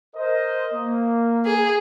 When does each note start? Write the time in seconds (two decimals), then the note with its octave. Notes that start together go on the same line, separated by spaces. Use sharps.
0.16 A#4 C5 D#5
0.73 A#3
1.46 G#4